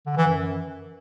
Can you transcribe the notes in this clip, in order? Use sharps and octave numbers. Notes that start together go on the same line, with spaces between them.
D3
E3
F#2